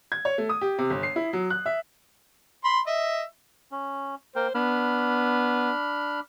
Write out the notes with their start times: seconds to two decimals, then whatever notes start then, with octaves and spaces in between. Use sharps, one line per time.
0.12 G#6
0.25 C#5
0.38 A3
0.49 D#6
0.61 G4
0.78 C3
0.90 G1
1.03 C7
1.16 E4
1.33 F#3
1.50 F#6
1.66 E5
2.65 B5 C6
2.87 D#5 E5
3.71 C#4
4.36 A#3 A#4 C5 G5
4.55 B3 D4 B5 F6